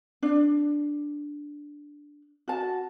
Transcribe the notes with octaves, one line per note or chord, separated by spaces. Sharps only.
D4
F#4 A5